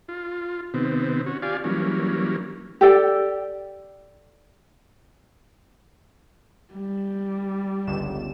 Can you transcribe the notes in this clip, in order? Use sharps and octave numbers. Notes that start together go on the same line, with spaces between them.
F4
C3 D#3 B3 C4
C#4 F#4
F4 G4 D5 F5 G#5
E3 F#3 G3 A#3 C#4
G4 A4 D5 G5
G3
G1 C#2 E7